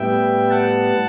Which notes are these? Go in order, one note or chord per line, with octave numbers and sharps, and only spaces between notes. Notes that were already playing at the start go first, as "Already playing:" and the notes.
Already playing: A2 G3 B3 E5 G5
F#5 A5